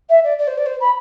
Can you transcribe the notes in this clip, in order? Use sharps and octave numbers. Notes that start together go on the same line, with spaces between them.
E5
D5
D5
C5
D5
C5
B5